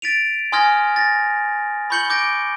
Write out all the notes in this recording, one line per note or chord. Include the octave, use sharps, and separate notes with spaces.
A6 B6 D7 D#7 F7
G#5 C6 D#6 F6 G#6 A#6
A6 A#6
B5 C#6 G6 C#7 F#7 G7
D6 G6 A#6 D7